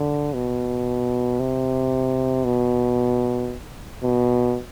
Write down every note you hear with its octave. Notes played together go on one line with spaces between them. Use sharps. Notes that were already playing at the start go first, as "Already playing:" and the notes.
Already playing: D3
B2
C3
B2
B2